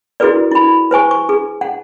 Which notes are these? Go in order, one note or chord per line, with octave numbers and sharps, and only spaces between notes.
E4 F#4 G#4 A#4 B4 D5
E4 B5
B4 C5 G#5 C#6
C#6
G#4
F#5